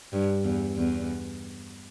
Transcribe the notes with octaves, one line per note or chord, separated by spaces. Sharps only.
G2
E2
E2